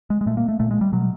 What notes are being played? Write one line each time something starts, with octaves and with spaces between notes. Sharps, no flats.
G#3
G#3
A#2 A3
A#3
A3
A#2 A3
G#3
G3
B2 F#3